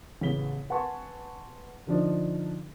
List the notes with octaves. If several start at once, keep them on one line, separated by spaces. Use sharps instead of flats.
A1 C#3 B3 B6 G7
B4 F#5 G#5 A5 C6 C#6
D3 F3 D4 D#4